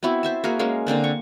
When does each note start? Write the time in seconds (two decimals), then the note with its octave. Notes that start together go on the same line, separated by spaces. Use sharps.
0.03 B3 C4 E4 F#4
0.23 C5 E5 A5
0.44 A#3 F#4 G#4 A#4
0.59 G#3 A#3 C#4
0.87 D3 A#3 C4 D4
1.04 C#6